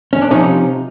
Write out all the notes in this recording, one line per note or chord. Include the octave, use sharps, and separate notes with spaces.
C#4
D4
C3 F3 C#4 D#4